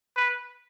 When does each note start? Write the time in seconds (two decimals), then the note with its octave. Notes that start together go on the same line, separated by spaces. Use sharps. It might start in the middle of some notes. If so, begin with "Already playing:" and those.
0.17 B4